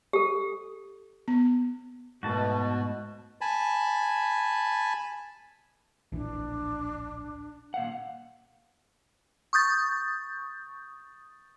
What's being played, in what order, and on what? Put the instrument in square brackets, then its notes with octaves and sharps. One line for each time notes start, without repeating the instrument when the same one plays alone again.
[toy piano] G4 A4
[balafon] B3
[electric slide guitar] G#2 A3 [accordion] B2 [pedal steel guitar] F#4 A5
[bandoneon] G#5 A5 B5
[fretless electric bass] D1 A#1 E3 [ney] D4
[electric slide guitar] A#2 F5 F#5
[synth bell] C#6 D#6 G6 A6